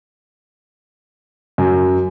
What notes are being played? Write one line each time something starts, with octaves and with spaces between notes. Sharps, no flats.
F#2